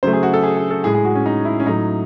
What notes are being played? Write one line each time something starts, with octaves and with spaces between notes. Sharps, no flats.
C#3 F#3 A3 C5
G#4
F#4
A4
G#4
G#4
A4
A2 G#3 G#4
G#4
F#4
C#4
D#4
E4
C#4
A2 F#3 A3 D#4